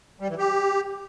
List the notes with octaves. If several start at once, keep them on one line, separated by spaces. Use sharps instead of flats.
G3
E3
G4